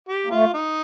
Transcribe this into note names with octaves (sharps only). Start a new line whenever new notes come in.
G4
A#3
A3 F4
D#4